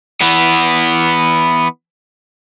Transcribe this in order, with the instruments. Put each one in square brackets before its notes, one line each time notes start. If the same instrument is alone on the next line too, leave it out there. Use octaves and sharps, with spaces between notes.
[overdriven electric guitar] E3 B3